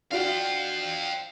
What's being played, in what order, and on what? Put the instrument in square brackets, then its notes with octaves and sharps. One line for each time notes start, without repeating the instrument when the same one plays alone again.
[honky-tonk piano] D4 F4 F#4 [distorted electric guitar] F5 G5